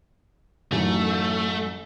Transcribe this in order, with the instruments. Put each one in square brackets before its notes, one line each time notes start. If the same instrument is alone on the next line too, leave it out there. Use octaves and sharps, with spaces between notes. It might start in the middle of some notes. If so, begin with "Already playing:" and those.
[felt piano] A1 F#2 D#3 [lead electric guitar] A3